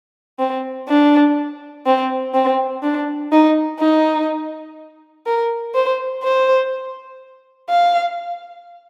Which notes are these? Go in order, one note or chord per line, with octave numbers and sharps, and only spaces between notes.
C4
D4
C4
C4
D4
D#4
D#4
A#4
C5
C5
F5